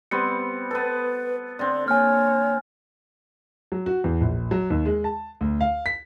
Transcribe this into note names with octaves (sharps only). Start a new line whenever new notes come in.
G3 B3 C4 C#7
B3 A4 B4
D3 C4 D5
A#3 C#5 G#5 F6
F#3
F#4
E2
A#1
F#3
D#2
G#3
A5
D2
F5
B6